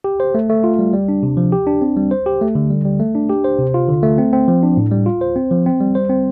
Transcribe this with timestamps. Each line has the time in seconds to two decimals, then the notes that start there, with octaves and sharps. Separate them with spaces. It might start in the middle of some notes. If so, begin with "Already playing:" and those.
0.04 G4
0.20 C5
0.35 A3
0.49 A3
0.64 F4
0.79 G3
0.93 G3
1.09 D4
1.23 C3
1.37 F3
1.52 G4
1.67 D4
1.82 C4
1.96 G3
2.11 C5
2.26 G4
2.41 A3
2.55 D3
2.70 G3
2.85 G3
3.00 A3
3.15 D4
3.30 G4
3.44 C5
3.59 C3
3.74 F4
3.89 D3
4.03 A3
4.18 C4
4.33 C4
4.48 F3
4.63 D4
4.77 A2
4.91 G3
5.06 F4
5.21 C5
5.36 C4
5.51 F3
5.66 C4
5.81 G3
5.95 C5
6.10 C4